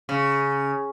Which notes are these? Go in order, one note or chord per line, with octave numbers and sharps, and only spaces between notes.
C#3